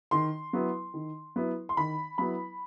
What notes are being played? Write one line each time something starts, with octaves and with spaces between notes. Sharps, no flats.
D#3 C6
F#3 B3 E4
D#3
F#3 B3 E4
C6
D#3 B5
F#3 B3 E4 B5